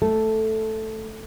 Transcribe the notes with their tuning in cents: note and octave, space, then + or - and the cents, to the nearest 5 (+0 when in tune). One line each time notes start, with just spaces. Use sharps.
A3 +0 A4 +0